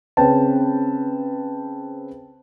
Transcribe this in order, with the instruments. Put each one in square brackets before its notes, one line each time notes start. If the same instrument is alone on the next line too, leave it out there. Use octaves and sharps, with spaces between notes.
[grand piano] C#3 C4 C#4 B4 G5 A5